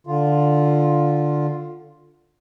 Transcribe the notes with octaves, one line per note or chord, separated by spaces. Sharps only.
D3 F4